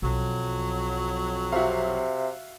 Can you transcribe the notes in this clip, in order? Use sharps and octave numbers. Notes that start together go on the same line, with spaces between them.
B1 F2 F#3
C3 F#4 E5 F5